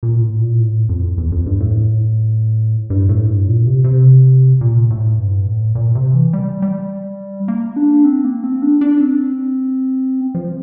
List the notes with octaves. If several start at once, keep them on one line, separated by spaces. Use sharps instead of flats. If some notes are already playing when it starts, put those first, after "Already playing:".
A#2
A2
A#2
A2
F2
E2
F2
G2
A2
G2
A2
G2
A#2
C3
C3
A#2
A2
G2
A2
A#2
C3
E3
G3
G3
A#3
D4
C4
A#3
C4
D4
D4
C4
F3